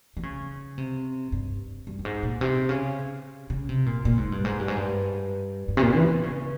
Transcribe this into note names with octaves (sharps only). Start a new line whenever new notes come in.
E3
C#3
C3
G2
G2
G2
G#2
A#2
C3
C#3
C#3
C3
A#2
A#2
G#2
G2
G#2
G2
G#2
G2
G2
C3
A#2
E3
E3
C#3